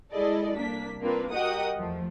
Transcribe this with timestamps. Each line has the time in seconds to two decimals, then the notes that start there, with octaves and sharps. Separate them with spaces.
0.12 G#3 E4 G#4 A4 D5 D#5
0.56 C2 A#3 D4 B6
1.01 A#3 C4 D4 F4 A#4 B4
1.32 F#4 G4 A#4 D#5 F#5 D#6
1.77 E2 F3 A3